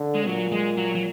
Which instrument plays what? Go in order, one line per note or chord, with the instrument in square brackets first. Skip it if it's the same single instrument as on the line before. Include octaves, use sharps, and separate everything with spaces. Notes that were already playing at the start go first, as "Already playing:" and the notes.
Already playing: [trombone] D3
[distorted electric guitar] G#3
[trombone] A#2 [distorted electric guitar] F#3
[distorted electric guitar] G#3
F#3
F#3